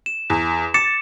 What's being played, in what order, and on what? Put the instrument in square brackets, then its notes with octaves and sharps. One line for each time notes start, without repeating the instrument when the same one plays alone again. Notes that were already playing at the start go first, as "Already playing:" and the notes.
[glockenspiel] E7
[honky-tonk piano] E2
[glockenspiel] D6 C#7 E7 [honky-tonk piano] A6